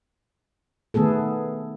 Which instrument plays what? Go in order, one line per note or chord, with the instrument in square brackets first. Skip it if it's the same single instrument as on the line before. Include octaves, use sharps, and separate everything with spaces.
[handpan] D#3 A3 B3 G#4 A4